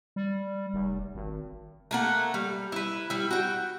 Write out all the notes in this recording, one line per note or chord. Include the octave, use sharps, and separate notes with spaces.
G3
F1
G#1
A3 A#3 F#5
G3
E4 B4
G3 E4
F#4 G5